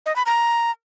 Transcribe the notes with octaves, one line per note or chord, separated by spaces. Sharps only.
D#5
B5
A#5